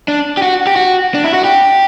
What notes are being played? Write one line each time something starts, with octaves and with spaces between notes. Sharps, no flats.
D4
G4
F#4
G4
F#4
D4
E4
F#4
G4